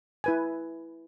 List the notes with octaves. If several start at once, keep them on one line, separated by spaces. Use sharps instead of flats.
E4 B4 G#5